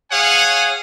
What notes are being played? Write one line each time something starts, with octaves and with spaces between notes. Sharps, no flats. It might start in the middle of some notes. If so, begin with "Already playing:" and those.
G#4 C#5 F5 F#5 G#5